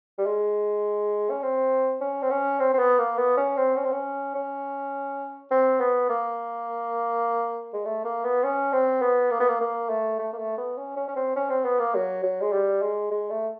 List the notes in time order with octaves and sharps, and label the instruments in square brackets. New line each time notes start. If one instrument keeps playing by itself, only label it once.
[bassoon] G3
G#3
C#4
C4
C#4
C4
C#4
C4
C4
B3
A#3
B3
C#4
C4
C#4
C4
C#4
C#4
C4
B3
A#3
G#3
A3
A#3
B3
C#4
C4
B3
A#3
B3
A#3
A#3
A3
A3
A#3
A3
B3
C#4
C#4
C#4
C4
C#4
C4
B3
A#3
F#3
F#3
G#3
G3
G#3
G#3
A3